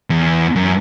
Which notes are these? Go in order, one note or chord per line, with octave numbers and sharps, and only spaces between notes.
E2
F#2